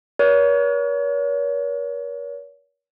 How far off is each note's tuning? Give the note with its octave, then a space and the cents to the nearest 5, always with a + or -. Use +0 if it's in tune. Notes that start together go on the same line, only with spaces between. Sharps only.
A#4 +45 C#5 +35